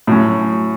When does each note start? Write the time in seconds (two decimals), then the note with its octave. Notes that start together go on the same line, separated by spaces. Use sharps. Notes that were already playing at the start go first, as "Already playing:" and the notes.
0.07 A2 F#3 C#4